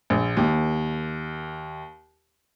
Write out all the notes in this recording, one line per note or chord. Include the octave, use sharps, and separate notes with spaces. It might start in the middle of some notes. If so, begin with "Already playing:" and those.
A#1
D#2